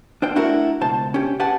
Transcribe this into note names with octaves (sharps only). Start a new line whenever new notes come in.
D4 C5 G5
A3 D4 E4 F#4 A#4
C#2 B2 C5 A5
C#4 G4
G4 B4 F#5 G#5 A5